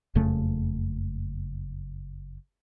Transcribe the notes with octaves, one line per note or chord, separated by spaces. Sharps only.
F#1 F2 C#3 A3